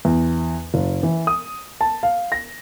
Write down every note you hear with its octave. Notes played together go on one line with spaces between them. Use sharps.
E2
F#1
E3
D#6
A5
F5
A#6